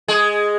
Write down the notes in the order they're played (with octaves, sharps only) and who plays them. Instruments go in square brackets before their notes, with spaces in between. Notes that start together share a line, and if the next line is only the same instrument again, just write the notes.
[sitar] G#3 G#4